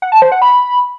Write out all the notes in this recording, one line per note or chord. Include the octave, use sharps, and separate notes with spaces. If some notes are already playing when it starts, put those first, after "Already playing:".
F#5
A5
C5
F#5
B5